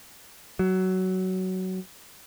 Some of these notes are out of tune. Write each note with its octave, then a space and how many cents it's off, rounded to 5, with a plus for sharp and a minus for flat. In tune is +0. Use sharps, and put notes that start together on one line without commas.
F#3 +15